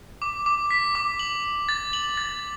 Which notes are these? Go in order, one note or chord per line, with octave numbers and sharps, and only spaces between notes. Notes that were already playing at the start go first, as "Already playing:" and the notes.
D6
D6
B6
D6
F#7
F#7
A6
F#7
A6